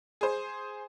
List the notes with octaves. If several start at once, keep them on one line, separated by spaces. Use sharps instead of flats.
G#4 C5